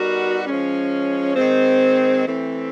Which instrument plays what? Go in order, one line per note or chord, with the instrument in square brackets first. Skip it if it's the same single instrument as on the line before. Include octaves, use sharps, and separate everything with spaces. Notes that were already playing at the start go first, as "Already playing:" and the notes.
Already playing: [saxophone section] G3 B3 D#4 F#4 A#4
F3 G#3 C#4
D#3 G#3 C4
E3 A3 C4